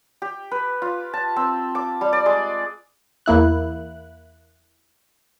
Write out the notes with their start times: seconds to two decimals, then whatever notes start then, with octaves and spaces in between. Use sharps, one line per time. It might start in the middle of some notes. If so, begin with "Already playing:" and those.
0.22 G4
0.51 B4
0.82 F4
1.14 A5
1.36 C4
1.75 D6
2.01 G3
2.13 D5
2.26 G#3
3.26 E2 A#3 E4 F#6